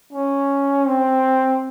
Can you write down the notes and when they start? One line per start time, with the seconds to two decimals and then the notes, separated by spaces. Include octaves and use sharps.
0.13 C#4
0.87 C4